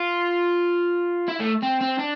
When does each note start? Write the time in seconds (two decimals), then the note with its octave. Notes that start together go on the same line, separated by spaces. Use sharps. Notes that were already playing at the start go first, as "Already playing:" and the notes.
Already playing: F4
1.28 E4
1.40 A3
1.63 C4
1.81 C4
1.99 D4